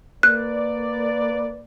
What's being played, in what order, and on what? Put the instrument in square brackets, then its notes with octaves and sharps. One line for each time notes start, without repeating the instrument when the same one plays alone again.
[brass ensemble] A#3 B4 D5 [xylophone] F#6